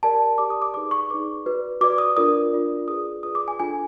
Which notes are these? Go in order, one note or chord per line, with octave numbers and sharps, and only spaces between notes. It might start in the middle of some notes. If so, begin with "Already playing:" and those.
G4 A#4 D5 A5
G4 A#4 D5 D6
D#6
D6
D#4 G#4 B4 D5 D6
C#6
D#4 G#4 B4 D5 D6
F#4 B4 D5
F#4 B4 D5 D6
D#6
D4 F4 A#4 D5 D#6
D4 F4 A#4 D5
F4 G#4 B4 D5 D#6
F4 G#4 B4 D5 D#6
D6
G#5
D4 F4 A4 G#5